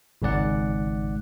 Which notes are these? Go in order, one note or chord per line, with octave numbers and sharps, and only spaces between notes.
G#1 C#2 G#2 D5 F#5